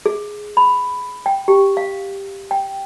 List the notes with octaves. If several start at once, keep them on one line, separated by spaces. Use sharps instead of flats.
G#4
B5
G5
G4
F5
G5